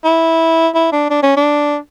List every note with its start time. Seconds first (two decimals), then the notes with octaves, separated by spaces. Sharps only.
0.04 E4
0.75 E4
0.92 D4
1.10 D4
1.23 C#4
1.37 D4